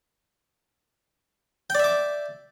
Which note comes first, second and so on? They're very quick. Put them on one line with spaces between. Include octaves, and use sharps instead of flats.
G5 D5 E5 D6